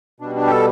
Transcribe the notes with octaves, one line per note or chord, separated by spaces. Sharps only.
B2 G3 D4
D4
G4
A4